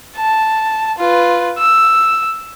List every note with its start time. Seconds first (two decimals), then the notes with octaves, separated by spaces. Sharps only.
0.16 A5
0.98 F4 B4
1.58 E6